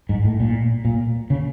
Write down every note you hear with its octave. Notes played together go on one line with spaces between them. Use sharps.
G#2
A2
A#2
A#2
C#3